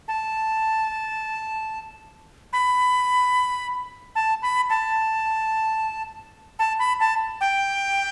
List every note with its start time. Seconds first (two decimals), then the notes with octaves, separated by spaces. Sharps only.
0.08 A5
2.53 B5
4.15 A5
4.42 B5
4.70 A5
6.59 A5
6.79 B5
7.00 A5
7.41 G5